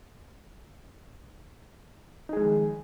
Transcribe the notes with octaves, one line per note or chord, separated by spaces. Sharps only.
D#3 F3 G#3 D#4 G#4